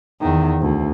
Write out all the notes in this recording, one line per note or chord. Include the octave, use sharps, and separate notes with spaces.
E2 D#3
D2